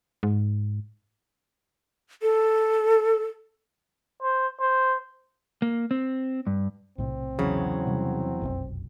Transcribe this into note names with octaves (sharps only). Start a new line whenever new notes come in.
G#2
A4
C5
C5
A#3
C4
G2
B1 A2 C3 C4
E2 C#3 F#3
C3 G3
F1 B1 F#2